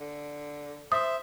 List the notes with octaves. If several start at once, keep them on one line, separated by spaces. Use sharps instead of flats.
D3
C5 E5 D#6